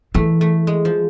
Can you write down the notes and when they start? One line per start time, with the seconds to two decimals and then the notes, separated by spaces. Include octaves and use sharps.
0.14 E3 A3
0.41 A3
0.67 G#3
0.85 F3